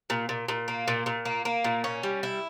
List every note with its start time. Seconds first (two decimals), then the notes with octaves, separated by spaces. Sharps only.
0.10 A#2
0.29 A#2
0.48 A#2
0.68 A#3
0.88 A#2
1.06 A#2
1.25 A#3
1.45 A#3
1.64 A#2
1.84 C#4
2.03 G3
2.23 E4